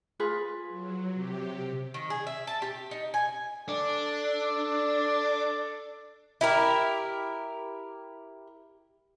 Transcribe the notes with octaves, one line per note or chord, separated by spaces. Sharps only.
F4 G#4 B4
F#3
C3 G4
D#3
G#4
E5
A5
G4
D#4
G#5
D4 A4 D5
E4 G4 A#4